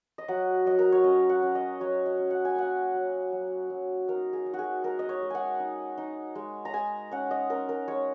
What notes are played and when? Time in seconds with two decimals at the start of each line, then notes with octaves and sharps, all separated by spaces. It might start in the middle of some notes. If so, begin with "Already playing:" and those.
0.18 D#5
0.28 F#3 F#5
0.66 F#3 D#5
0.79 A#4
0.92 C#5
1.04 C#4 D#5
1.29 F#5
1.42 C#4
1.55 D#5
1.80 F#3 C#5
2.06 D#5
2.19 C#4
2.31 F#5
2.45 G#5
2.56 A#3 F#5
2.94 F#3
3.32 F#3
3.70 F#3
4.07 D#4 A#4
4.33 G#4
4.46 D#4
4.54 F#4
4.59 G#4
4.84 G#3 A#4
4.99 D#5
5.09 C#5
5.22 G#3
5.30 F#5 G#5
5.60 D#4
5.98 D#4
6.35 G#3
6.65 A#5
6.73 G#3 G#5
7.11 C#4 F#5
7.31 D#5
7.50 C#4 A#4
7.69 A#4
7.88 G#3 C#5